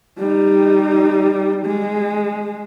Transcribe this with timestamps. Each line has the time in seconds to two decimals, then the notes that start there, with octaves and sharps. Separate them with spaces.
0.18 G3 D#4
1.66 G#3